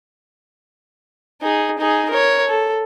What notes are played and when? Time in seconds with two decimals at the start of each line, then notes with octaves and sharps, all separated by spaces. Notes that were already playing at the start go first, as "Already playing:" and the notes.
1.42 D#4 G#4
1.78 D#4 G#4
2.10 A#4 C#5
2.48 A4